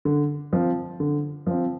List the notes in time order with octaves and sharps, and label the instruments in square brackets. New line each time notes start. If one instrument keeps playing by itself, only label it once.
[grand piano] D3
F3 C4
D3
F3 C4